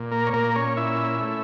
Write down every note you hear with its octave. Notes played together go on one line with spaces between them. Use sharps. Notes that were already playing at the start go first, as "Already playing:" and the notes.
Already playing: A#2
A#3 A#4
C#5
A#2 A#3 A#4
C#4 C#5
C#4 E4 E5
A3